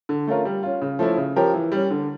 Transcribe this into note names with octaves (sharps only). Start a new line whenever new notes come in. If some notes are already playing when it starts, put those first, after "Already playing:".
D3
A3 C#4 F4 A#4
G3
C#4 F4
C#3
F3 A3 C#4 E4
C#3
F3 C#4 G4 A#4
E3
G3 C#4
D3